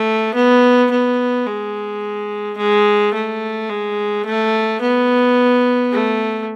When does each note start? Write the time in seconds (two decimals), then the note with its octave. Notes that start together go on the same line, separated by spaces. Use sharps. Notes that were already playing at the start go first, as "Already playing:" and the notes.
Already playing: A3
0.34 B3
0.91 B3
1.46 G#3
2.57 G#3
3.13 A3
3.69 G#3
4.25 A3
4.81 B3
5.92 A3